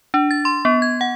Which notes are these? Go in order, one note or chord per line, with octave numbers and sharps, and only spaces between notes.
D4
A6
C6
B3
G#6
F#5